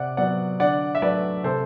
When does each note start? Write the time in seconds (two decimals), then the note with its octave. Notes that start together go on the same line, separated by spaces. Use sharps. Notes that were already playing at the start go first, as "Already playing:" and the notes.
Already playing: C3 D5 F#5
0.17 F#3 B3 D5 F#5
0.59 D3 D5 F#5
0.95 E5
1.02 F#3 A3 B4 D5
1.44 C3 A4 C5